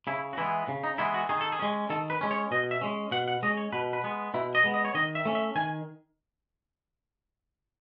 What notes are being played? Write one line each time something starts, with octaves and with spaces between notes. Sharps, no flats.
C#3 E4
F#4
E3 G#3 B3 E4
C#3
D#4
E3 G#3 B3 E4
F#4
D#3 G#4
A4
G#4
G#3 C#4
D#3 A4
B4
G#3 C#4
C#5
B2 D#5
E5
G#3 C#4
B2 F#5
F#5
G#3 C#4 D#5
C#5
B2 B4
B4
G#3 B3
B2 E4
D#5
G#3 B3
D#5
C#5
D#3 D#5
E5
A3 C#4
E5
D#3 G#5